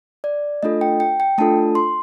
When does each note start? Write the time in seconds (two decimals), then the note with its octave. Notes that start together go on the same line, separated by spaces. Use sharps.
0.24 D5
0.63 A3 D4 F4 A4 D#5
0.81 G5
1.00 G5
1.20 G5
1.38 A3 D4 F4 A4 A5
1.75 C6